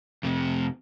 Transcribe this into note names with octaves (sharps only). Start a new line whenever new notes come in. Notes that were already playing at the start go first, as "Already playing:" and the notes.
F2 C3